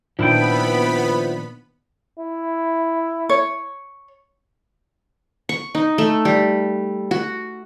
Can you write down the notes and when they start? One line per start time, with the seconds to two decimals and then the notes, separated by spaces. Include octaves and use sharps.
0.19 A#2 D#3 F3 B3 D4 E4 G5 B5
2.19 E4
3.29 C#5
5.49 C#6
5.75 D#4
5.98 A3
6.25 G3
7.11 F#4